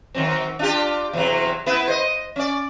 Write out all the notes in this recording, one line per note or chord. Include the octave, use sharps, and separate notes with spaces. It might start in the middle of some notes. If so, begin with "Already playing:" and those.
D#3 F#3 C4
D4 F4 G4
E2 C3 F#3
B3 E4 B4
C5 D#5
C#4 D5